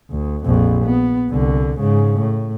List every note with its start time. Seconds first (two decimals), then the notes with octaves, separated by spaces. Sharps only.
0.10 D2
0.46 A#1 F2
0.85 B3
1.30 C2 D3
1.79 G#2 C#3
2.19 A2